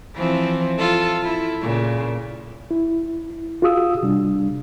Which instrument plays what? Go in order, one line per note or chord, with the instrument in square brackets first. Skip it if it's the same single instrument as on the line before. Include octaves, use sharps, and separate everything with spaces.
[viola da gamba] E3 F3 C4
F4 A4
E4
A#2 C#3
[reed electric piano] E4
F4 F#4 G#4 F5 D#6 E6
C3 G3 D4